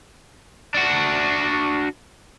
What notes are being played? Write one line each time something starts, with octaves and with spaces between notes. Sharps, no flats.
D4 F#4